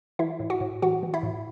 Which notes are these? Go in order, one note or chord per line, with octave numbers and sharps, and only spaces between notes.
E3 E4 E5
A2
F#4 F#5
A2
E3 F#4 F#5
E3
E4 E5
A2